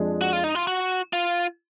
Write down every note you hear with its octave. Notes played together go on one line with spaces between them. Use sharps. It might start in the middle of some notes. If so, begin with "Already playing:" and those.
Already playing: F2 F3 G#3 D4 G#4
F#4
F4
D#4
F4
F#4
F4